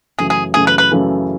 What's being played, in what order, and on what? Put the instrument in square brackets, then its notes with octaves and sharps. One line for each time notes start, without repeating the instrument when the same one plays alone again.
[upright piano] F#2 C#3 E3 A3 [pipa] G#4
[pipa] G#4
[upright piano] F#2 C#3 E3 A3 [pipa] G#4
[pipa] B4
B4
[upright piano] F#2 C#3 E3 A3